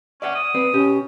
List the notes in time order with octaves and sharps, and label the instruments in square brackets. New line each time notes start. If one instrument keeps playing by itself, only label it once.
[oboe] C#4 [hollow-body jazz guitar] D5 E5 F#5
[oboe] D#6
[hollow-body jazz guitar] C4 B4 D5
[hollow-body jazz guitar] B2 G4 [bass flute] C#4